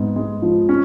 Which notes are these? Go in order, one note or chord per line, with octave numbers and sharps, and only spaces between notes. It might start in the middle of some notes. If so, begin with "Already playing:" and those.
Already playing: G#2 B3
G#3
F3
C#4